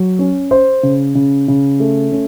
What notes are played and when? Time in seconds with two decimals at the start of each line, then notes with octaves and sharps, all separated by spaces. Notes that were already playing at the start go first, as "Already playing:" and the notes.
Already playing: F#3
0.19 C#4
0.51 C5
0.83 C#3
1.15 C#3
1.48 C#3
1.80 A3
2.12 C#4